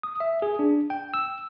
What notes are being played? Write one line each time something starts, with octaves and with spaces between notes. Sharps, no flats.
D#6
E5
G#4
D4
G5
E6